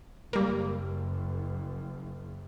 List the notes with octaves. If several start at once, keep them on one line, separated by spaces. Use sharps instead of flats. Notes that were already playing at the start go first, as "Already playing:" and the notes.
F#1 F#2 G3 A#3